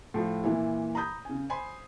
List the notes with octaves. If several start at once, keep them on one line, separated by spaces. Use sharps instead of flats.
A2 F3
A#2 E3 E4
A#5 B5 D#6 G6
C#3 G#5
C5 G#5 B5 C6